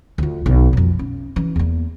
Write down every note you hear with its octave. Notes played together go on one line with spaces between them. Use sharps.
D2 F4
B1
F2 B2
C#4
E3 C#4
E2 A#3